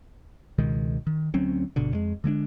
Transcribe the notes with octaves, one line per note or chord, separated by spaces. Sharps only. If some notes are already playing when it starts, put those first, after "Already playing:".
C#2 B2 D#3 G#3
D#3
D2 F#3 C4 C#4
G1 B2 D3
F2 G#3
D3 G#3 A#3 D4